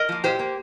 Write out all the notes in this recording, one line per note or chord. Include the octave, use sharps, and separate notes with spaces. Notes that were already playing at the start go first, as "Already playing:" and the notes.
Already playing: A#4 D#5
F3 A#3
A#2 G4 C5
A#3